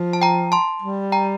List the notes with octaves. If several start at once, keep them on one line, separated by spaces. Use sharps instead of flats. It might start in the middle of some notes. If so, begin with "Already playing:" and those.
Already playing: F3
A5
G5 A#5
A5 C6
G3
G5 A#5